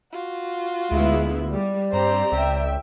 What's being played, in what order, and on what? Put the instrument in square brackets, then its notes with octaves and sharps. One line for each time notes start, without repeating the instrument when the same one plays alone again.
[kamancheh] F4 F#4
[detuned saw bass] D2 [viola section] G#3 B3 E4 [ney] E5
[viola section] G3 [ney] D5
[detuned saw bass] G2 [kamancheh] C4 A#5 [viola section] G4 C5
[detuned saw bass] C#2 [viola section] E5 G5